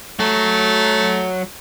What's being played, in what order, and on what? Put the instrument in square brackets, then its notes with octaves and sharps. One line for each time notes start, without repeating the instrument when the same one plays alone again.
[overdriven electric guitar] F#3 [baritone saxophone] A3